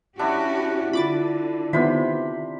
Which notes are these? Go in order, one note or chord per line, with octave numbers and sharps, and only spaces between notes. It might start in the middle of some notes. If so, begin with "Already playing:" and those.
C#4 D4 E4 F#4 G4
D3 F4 B5 D6 A6
C3 D#3 B3 F4 C5 E5 B5